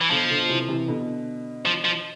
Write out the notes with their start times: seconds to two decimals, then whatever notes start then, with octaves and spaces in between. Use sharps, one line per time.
0.01 E3
0.10 B2 D3 F3
0.30 B2 D3
0.49 C3 E3
0.68 C3 E3
0.88 B2 D3
1.66 F3
1.85 F3